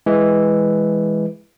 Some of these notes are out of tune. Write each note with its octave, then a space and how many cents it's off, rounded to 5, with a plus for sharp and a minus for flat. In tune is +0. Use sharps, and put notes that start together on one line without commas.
E3 +0 G#3 +0